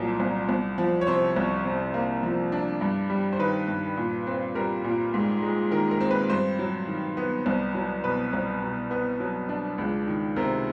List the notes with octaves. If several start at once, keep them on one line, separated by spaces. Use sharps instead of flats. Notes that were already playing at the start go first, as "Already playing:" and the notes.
Already playing: C2 A#2 F#3 A#4
C2
C2
F3
C#5
C3 C5
C2
C3
A#3
F3
D4
G2
G3
C5
D#3 B4
G2
A#2
C4
G3 A#4
A#2
G#2
G#3
D#3 A#4
A#4
C4
B4
G2 C5
F#3
D#3
B3
C2
F#3
B2 B4
C2
B2
B3
F#3
D4
C#2
D#3
C3 A#4